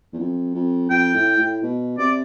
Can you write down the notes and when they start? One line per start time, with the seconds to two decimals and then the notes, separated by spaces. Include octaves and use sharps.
0.13 E2
0.19 F2
0.55 F2
0.90 F2 G5
1.15 A2
1.38 A2
1.63 B2
1.98 C3 D5